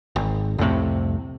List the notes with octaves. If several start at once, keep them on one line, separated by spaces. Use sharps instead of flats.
G#1
C2 F2 A2 C3